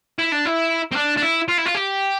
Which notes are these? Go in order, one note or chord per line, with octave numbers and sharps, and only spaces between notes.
E4
D4
E4
C4
D4
D4
E4
F4
E4
F4
G4